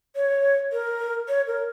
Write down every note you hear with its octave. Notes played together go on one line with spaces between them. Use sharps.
C#5
A#4
C#5
A#4